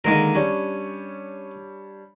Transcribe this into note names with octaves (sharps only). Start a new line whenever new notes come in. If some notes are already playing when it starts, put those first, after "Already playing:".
D3 D#3 G#3 A#3 A#4
G3 C#4 D4 C#5